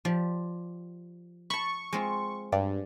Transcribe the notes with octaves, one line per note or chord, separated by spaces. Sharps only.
F3 G4 D5
A5 B5 C#6
G#3 C4 F4
G2 D5